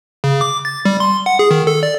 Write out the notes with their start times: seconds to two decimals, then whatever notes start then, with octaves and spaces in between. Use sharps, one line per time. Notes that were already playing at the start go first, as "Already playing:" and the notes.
0.24 C#3
0.41 D6
0.65 A6
0.85 G3
1.00 C6
1.26 F#5
1.39 G#4
1.51 D#3
1.67 A4
1.83 D5